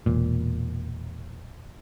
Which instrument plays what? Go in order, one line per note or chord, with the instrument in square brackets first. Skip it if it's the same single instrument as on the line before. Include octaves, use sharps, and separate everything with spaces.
[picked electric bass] E1 A#2